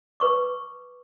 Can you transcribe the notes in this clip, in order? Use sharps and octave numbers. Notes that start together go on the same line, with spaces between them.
B4 C#6 D6